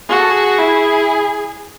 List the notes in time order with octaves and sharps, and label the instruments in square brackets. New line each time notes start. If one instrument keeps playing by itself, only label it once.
[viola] F#4 [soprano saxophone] G#4
[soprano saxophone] A4
G#4
[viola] E4